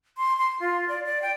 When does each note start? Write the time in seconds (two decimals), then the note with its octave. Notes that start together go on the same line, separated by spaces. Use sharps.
0.17 C6
0.37 C6
0.60 F4
0.88 D5
1.05 D5
1.22 G5